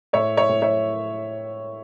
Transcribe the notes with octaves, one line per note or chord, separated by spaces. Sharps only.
A2 C#5 E5
C#5 E5
A2
C#5 E5